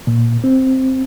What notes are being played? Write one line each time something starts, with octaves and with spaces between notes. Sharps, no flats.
A#2
C4